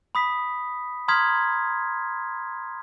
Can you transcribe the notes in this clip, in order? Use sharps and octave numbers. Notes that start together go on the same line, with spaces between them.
B5 D#6 B6
A#5 C6 D#6 F6 G#6 B6